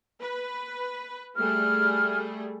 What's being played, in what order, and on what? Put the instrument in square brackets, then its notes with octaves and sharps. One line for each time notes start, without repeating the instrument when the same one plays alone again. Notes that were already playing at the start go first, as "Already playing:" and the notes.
[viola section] B4
[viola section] G3 A3 G#4 [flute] F6